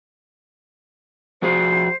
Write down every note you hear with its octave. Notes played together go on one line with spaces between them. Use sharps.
F3 F#4 G#4 C5